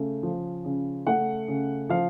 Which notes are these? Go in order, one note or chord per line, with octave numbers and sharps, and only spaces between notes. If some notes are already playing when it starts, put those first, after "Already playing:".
Already playing: C#3 A3
F3
C#3
A3 F#5
C#3
F3 F5